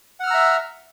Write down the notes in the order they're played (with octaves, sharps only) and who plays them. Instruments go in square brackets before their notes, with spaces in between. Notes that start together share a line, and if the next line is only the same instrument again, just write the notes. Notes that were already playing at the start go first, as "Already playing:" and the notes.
[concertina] F#5
F6
E6
A#5
E5